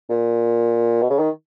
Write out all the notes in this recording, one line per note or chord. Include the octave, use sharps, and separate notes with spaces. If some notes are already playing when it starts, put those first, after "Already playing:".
A#2
B2
C#3
D#3